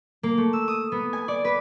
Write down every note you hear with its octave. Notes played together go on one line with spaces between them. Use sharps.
A#3
A3
E6
D#6
B3
G#5
D5
B4